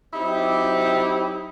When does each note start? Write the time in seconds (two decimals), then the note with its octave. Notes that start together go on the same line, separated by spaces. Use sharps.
0.14 F#3 C4 D#4 E4 G4